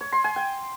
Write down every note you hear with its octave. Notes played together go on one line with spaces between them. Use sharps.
C#5
C6
G#5
G5